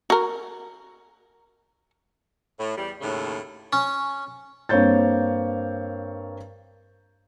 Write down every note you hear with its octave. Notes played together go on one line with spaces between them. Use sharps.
F#4 A#4
A2
E2 G3
D#2 A2 C#3
C#4
G2 A#3 C4 C#5 G6 A6